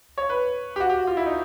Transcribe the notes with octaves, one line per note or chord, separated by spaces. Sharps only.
C#5
B4
G4
F#4
G4
F#4
F4
E4
D#4